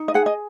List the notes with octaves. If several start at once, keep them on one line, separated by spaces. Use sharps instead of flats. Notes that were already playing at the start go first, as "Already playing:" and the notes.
Already playing: D#4
D#5
G#4 F#5
D#5